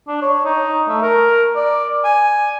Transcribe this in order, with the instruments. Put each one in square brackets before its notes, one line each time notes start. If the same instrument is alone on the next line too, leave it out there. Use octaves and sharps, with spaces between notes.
[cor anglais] D4
C#5
D#4
A3
A#4
D5
G#5